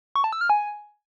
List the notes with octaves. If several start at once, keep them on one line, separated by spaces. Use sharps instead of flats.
C#6
A5
E6
F6
G#5